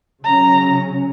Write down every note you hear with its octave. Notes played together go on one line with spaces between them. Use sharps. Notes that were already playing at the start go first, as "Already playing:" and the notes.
C#3 F#3 C#4 A#5